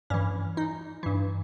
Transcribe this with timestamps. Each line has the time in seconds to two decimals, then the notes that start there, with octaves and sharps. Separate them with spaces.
0.10 G2 E3 C#4
0.57 D#4
1.03 G2 E3